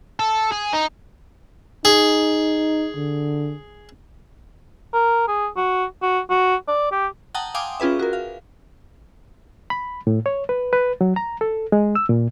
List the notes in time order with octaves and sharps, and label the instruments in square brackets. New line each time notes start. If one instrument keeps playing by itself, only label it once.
[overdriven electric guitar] A4
G#4
D#4
[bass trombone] D#4 [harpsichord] G#4
[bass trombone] D3
[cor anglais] A#4
G#4
F#4
F#4
F#4
D5
G4
[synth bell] F#5 G5 A5 A#5 D#6
F5 G5 G#5 C6 D6 D#6
C#4 F4 G#4 B4 E5
F#4 A#4
F5
[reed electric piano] B5
A2
C#5
B4
B4
F#3
A#5
A4
G#3
E6
A#2